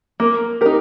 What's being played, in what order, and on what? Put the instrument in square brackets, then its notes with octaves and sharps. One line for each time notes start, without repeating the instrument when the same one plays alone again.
[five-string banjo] A#3 [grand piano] A#4
[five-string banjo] D#4 A#4 [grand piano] G4